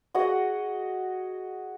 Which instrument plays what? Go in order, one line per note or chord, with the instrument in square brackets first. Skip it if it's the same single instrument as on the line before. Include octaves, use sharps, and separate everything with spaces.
[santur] F#4 G#4 D#5 F#5